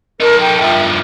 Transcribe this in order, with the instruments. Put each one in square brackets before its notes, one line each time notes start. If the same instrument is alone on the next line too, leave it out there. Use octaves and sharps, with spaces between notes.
[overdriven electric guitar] D#4 A4 [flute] A#4
[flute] G5
[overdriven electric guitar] G2 F3 [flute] E5